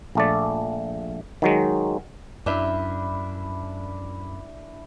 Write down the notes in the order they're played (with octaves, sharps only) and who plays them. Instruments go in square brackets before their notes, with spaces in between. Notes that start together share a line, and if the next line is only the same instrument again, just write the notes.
[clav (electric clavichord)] A#1 A3 D5
D#3 F#3 G#3
[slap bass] F#2 [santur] D4 E4 E5